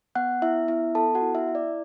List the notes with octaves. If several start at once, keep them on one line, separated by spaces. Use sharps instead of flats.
B3 F#5 F#6
B3 E4 E5
B3 E4 E5
B3 A4 A5
F#4 F#5
E4
E4 E5
E4
D5